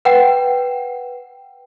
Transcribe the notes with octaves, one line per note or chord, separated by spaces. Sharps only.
B4 F#5 G5